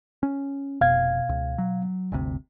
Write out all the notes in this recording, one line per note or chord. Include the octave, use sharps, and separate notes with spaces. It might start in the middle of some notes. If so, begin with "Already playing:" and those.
C#4
F1 B2 F5 G#6
C#2
F#3
G1 D2 C3